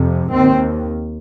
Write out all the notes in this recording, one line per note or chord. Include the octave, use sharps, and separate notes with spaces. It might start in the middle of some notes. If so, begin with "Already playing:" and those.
Already playing: F2 C3
D#2 C4